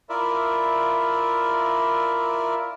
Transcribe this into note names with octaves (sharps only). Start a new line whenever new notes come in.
E4 F4 A#4 D5 E5